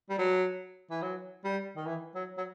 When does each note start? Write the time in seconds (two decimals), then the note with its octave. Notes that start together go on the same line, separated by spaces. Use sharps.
0.10 G3
0.18 F#3
0.91 E3
1.02 F#3
1.44 G3
1.76 D#3
1.86 E3
2.15 F#3
2.38 F#3